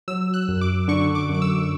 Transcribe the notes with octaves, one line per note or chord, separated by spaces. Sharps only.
F#3 E6
F#6
F#2
D6
D3 C#6
D6
F#2
D6
E6